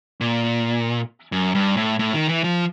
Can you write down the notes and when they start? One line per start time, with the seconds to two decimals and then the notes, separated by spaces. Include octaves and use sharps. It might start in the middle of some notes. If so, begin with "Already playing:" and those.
0.21 A#2
1.32 F#2
1.55 G2
1.77 A2
1.99 A2
2.14 D#3
2.29 E3
2.44 F3